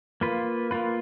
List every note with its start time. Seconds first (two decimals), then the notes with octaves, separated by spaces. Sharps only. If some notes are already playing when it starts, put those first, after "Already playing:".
0.21 A#3 F4 B4
0.71 A#3 F4 B4